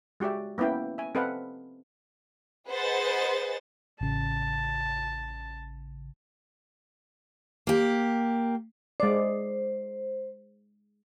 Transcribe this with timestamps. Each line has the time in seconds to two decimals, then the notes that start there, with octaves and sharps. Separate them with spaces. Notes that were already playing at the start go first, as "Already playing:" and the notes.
0.20 G#3 F#4 G4 D5 E5
0.58 A#3 B3 C#4 E4 G5
0.98 E5 G#5
1.15 C4 A4 B4 D#5 F5 F#5
2.69 G#4 B4 C5 D#5 F#5 A6
4.00 A1 C#3 A5
7.67 A#3 G4
9.00 G#3 C5 D5